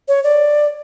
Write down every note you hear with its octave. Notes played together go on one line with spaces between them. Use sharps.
C#5
D5